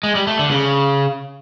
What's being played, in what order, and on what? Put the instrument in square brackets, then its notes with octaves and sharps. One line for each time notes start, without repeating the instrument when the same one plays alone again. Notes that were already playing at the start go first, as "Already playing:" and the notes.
[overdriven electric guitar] G#3
G3
A3
D3
C#3